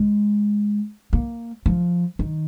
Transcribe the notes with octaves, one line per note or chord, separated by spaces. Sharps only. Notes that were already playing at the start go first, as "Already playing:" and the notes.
Already playing: G#3
A#3
F3
D#3